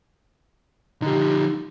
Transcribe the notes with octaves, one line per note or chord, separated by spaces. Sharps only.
D3 F3 D#4 G4